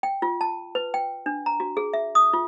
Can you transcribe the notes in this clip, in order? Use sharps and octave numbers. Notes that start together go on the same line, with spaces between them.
G5
F4
A5
B4
G5
D4
A#5
F#4
G#4
E5
D#6
F4